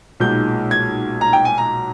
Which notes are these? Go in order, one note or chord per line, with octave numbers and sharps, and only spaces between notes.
B1 A#2 G#3 D#4 G6
G#6
A#5
G5
G#5
A#5